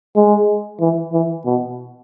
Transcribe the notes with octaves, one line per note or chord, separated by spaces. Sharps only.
G#3
E3
E3
B2